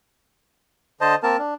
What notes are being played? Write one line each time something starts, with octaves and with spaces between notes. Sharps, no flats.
D3 C5 D#5 A5
A#3 C4 A#4 A5
D4